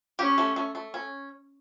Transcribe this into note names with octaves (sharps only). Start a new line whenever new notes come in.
C#4 G4
A3
A3
A3
C#4